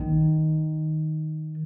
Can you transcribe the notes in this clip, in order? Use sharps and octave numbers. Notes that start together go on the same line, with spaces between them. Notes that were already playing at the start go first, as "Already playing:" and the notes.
Already playing: D#3